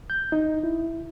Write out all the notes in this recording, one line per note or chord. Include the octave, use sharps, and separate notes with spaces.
G6
D#4
E4